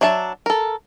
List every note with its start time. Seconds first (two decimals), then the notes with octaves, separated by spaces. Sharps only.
0.01 F#3 D4 E5 A5
0.46 A4 A#4